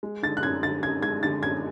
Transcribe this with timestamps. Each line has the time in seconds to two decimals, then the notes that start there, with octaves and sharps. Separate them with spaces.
0.03 G#3
0.23 D3 A6
0.37 F#6
0.43 F#2 G#6
0.63 D3 A6
0.83 F#2 G#6
1.02 G#3 G#6
1.23 D3 A6
1.43 F#2 G#6